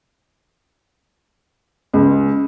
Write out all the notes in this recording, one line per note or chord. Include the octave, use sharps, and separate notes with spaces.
C#2